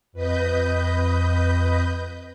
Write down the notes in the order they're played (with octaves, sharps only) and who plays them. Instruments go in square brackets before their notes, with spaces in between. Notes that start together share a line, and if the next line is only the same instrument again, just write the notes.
[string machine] F2 B4 D#5 G6